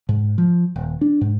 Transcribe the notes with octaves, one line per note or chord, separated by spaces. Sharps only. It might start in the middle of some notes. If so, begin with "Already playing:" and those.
G#2
F3
D#1
D4
G#2